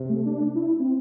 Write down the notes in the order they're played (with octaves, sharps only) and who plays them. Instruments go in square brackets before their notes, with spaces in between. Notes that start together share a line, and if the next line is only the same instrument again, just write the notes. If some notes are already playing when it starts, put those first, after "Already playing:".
Already playing: [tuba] C3
[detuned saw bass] A3
D4
E4
C4